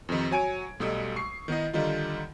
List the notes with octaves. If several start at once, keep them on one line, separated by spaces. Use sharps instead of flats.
F2 C3 D#3
F#3 C#5 G#5 G#6 D7
B1 G3 A3 D#4 D#6 E6
C#6 C7
D#3 B3 E4 D#5
D3 D#3 G3 D#4 F4